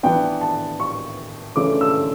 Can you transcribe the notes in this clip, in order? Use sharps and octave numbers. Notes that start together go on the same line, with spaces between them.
E3 B3 D4 G5
A5
C#6
C#3 E3 A3 D4 D6
E6